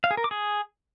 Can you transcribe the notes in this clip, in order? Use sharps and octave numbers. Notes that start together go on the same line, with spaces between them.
F5
G#4
A#4
D6
G#4